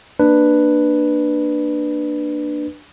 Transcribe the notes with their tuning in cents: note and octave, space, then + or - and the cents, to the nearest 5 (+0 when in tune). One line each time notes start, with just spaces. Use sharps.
A#3 +0 D4 +15 B4 +0